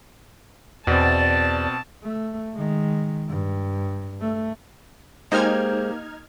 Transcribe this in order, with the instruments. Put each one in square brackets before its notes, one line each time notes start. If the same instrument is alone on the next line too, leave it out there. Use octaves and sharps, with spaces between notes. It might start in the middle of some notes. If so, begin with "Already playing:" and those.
[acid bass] E2 [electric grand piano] B2 C4 [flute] D5 [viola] A5
[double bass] A3
D#3 G#3
G2
A3
[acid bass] G#3 [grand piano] A#3 G4 [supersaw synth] D#4 F6 G#6 [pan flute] C5